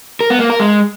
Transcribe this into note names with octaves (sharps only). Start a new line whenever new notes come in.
A#4
B3
A#3
A#4
G#3